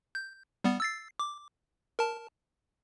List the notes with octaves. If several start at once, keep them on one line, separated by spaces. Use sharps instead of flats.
G6
G3 B3
E6 A6 C7
D6
A#4 A5